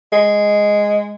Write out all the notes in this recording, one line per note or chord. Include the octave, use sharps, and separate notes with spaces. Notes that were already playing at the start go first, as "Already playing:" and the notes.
G#3